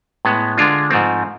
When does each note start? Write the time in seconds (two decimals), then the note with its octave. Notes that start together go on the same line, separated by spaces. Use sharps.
0.25 A2 G#3 B3
0.57 D3 G#3 D4 F4
0.90 G#2 F3 A3 C4